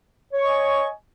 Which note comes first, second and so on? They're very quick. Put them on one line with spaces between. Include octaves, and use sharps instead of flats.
C#5 C#6 D#5 G#5